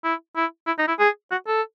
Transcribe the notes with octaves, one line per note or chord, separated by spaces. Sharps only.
E4
E4
E4
D#4
E4
G#4
F#4
A4